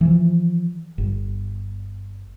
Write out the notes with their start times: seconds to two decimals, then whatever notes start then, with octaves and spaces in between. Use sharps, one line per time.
0.01 E3 F3
0.98 G1